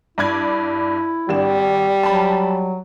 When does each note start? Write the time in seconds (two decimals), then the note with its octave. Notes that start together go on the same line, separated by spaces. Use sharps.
0.18 G2 E4 D5 G#6
1.29 G#1 G3 D4 E7
2.03 F#3 A5 B5